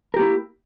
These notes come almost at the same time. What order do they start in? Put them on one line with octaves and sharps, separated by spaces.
A#4 G4 A#3 E4